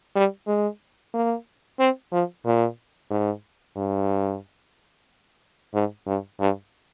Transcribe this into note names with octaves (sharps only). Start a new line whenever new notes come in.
G3
G#3
A#3
C4
F3
A#2
G#2
G2
G#2
G2
G2